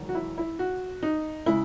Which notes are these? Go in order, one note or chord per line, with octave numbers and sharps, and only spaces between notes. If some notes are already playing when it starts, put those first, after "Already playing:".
Already playing: E1 E2 D#3 F#3
F#4
E4
E4
F#4
D#4
C#3 G#3 E4